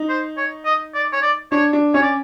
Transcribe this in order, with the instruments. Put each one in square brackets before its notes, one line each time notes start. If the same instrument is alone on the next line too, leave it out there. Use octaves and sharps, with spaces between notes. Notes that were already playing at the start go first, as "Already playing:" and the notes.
Already playing: [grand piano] D#4
[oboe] C5
C#5
D#5
D5
C#5
D5
[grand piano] D4 [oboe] C#5
[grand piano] D4
[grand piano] C#4 [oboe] C#5
[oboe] D5